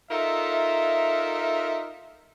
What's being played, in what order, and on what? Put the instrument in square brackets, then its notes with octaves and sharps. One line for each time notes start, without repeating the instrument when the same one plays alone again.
[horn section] D#4 F4 A4 A#4 E5